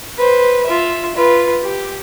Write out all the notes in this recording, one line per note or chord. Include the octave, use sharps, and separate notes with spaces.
B4 C5
F4 E5
F4 B4
G4